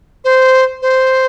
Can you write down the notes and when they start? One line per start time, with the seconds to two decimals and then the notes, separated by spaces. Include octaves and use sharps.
0.24 C5
0.82 C5